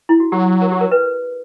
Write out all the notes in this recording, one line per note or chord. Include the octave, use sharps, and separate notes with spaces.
E4
F#4
F#3 G4
A#4
G4
A#4
B4